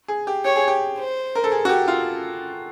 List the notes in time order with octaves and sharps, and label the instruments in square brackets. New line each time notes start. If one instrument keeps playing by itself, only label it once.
[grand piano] G#4
G4
[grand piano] G4 [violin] C#5
[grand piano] G#4
G4
[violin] C5
[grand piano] A#4
A4
G#4
F#4
G4
F4